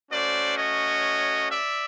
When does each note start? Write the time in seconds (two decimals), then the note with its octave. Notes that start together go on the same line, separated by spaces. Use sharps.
0.11 A3 C#4 F#4 C5 D5
0.57 C#5 D#5
1.50 D5 E5